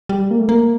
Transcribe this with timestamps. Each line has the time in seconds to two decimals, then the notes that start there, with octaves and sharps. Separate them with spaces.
0.09 G3
0.31 A#3
0.39 A3
0.49 A#3